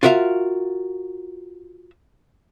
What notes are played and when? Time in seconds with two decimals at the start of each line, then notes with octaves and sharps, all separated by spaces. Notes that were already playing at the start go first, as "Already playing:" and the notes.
0.03 F4 F#4 A#4 E5 F5